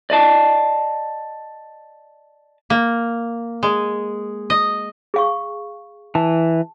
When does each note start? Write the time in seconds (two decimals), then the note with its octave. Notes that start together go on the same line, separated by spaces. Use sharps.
0.10 D5 D#5 A5
2.70 A#3
3.63 G#3
4.50 D#5
5.14 G#4 F5 C#6
6.15 E3 A5